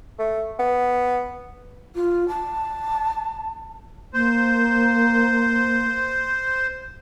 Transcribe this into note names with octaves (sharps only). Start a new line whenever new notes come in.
A3
B3
F4
A5
A#3 C5